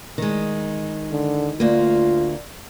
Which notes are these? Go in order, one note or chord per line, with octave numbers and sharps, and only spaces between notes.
D#3 G#3
D3
D2 A#3 F4